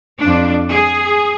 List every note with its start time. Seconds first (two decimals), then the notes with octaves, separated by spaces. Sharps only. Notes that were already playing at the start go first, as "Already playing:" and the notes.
0.20 F2 D4
0.70 G#4